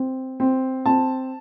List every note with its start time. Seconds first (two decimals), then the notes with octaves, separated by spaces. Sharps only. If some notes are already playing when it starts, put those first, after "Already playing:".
Already playing: C4
0.40 C4
0.86 C4 A5